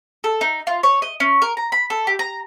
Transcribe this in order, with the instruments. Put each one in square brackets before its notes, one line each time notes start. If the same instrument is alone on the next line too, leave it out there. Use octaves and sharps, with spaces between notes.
[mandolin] A4
D#4
F4
C#5
D#5
C#4
A#4
A#5
B5
A4
G4
A#5